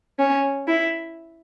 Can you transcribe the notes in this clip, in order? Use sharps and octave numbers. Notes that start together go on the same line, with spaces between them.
C#4
E4